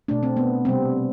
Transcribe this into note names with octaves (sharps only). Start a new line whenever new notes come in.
B2 A3 D4
C4
B3
C3 G3 C4